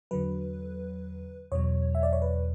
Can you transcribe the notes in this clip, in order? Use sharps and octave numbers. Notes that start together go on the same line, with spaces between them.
E2 D3 F#3 B4
E2 B2 F#3 C#5
E5
D5
C#5
B4